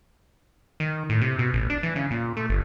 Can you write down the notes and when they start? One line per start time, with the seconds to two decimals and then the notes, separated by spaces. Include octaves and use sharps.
0.80 D#3
1.10 A2
1.22 C3
1.39 B2
1.54 A1
1.70 D4
1.83 E3
1.96 C#3
2.11 A#2
2.37 A3
2.50 G1